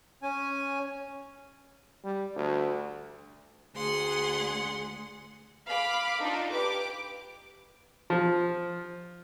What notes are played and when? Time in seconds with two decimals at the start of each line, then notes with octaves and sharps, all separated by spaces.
0.22 C#4 G#5
2.04 G3
2.36 D2
3.76 D2 G#4 F#5 C6
5.67 F5 B5 D6
6.21 D4 D#4 F4
6.51 G4 B4 D6
8.10 F3